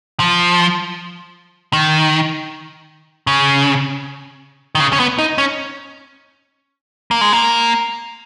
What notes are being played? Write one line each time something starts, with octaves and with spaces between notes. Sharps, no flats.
F3
D#3
C#3
D#3
C#3
C#4
B3
D#4
C#4
A#3
G#3
A#3